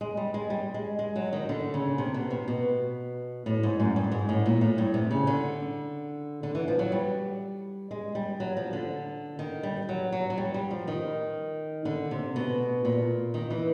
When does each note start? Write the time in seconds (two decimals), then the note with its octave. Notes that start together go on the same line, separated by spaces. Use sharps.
0.01 G#3
0.17 G3
0.34 G#3
0.50 G3
0.74 G#3
0.99 G#3
1.16 F#3
1.33 D#3
1.49 D3
1.74 C#3
1.98 C3
2.14 B2
2.30 C3
2.48 B2
3.46 A2
3.63 G#2
3.80 F#2
3.96 G2
4.12 G#2
4.29 A2
4.46 A#2
4.61 A2
4.78 G2
4.94 C3
5.11 C#3
5.27 D3
6.43 D3
6.55 E3
6.68 F3
6.79 F#3
6.92 G3
7.91 G#3
8.15 G3
8.40 F#3
8.57 F3
8.73 D3
9.39 D#3
9.63 G3
9.89 F#3
10.12 F#3
10.30 F#3
10.38 G3
10.54 G3
10.70 F3
10.87 D#3
11.85 D3
12.11 C3
12.36 B2
12.85 A#2
13.34 D#3
13.50 E3